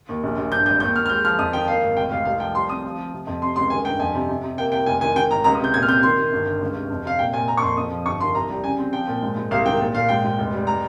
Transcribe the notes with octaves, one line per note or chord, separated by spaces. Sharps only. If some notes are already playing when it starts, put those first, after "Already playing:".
D#2
A#1
A#1
G2 G6
G#1 G6
D#2 G6
D#2 F6
F6
G#3 G6
F3 F6
F2 D#6
D#3 G5
A#3 F5
G#1
F1 G5
F1 F5
C2 F5
F3 G5
G3 C6
C4 D#6
F3
F3
C3
F2
C3 C6
C#2 C6
D#3 G#5
G2 G5
F2 G#5
C3
C3
C3
A#3 G5
C2 G5
F1 G#5
D#3 G#5
D#3 G5
G#1 A#5
C#2 A#5
D#6
C3 G6
A#2 G#6
F6
C4 G6
D#3 C6
D#3
G1
G2
C#2
C3
F2
C3 F5
A#2 G5
A#2 G#5
A#3 A#5
C#6
F2 C6
F2 D#6
F3
G1 C#6
D#3 C6
C2 A#5
G3
C#3 G#5
C4
F3 G5
A#2
G#2
G#2
C2 F5
D#3 G5
A#2
A#2 F5
G#2 G5
G#2
F1
G3
A#5